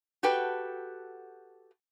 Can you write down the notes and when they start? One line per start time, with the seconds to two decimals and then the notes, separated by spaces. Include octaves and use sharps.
0.23 F#4 G4 A4 B4 G5